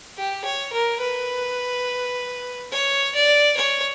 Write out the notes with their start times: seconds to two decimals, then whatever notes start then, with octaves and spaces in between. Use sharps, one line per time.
0.18 G4
0.45 C#5
0.73 A#4
1.02 B4
2.72 C#5
3.15 D5
3.57 C#5